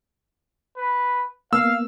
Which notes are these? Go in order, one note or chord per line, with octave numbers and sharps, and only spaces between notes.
B4
A#3 B3 F5 E6